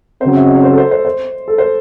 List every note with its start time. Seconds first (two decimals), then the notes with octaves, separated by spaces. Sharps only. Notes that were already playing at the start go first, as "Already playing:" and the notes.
0.21 C#3 F#3 C4 C5
0.36 E5
0.45 D#5
0.55 C#5
0.64 C5
0.71 A4
0.78 C5
0.91 C5
1.05 C5
1.48 A4
1.58 C5